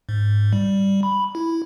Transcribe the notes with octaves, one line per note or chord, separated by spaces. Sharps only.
G#2
G3
B5
E4